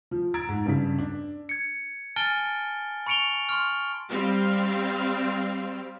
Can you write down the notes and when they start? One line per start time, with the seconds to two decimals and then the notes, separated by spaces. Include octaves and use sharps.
0.11 F3
0.34 A#5 E6 G#6 A6 D7
0.49 G#2
0.66 G2 C#3 B6
0.99 D4
1.49 G#6 C#7
2.16 G#5 A5 F6 A6 D7 G7
3.06 B5 C#6 C#7 D7 F7 G7
3.49 C6 C#6 F6
4.10 G3 C4 F5